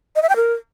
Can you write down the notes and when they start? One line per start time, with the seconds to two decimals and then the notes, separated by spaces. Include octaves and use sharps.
0.16 D#5
0.22 E5
0.29 G5
0.36 A#4